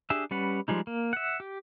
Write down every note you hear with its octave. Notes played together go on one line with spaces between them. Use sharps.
D4 G4 G#4 E5
G3 C#4 B4 F#5
F3 G3 G#3 D#4
A#3
E5 F#5
G4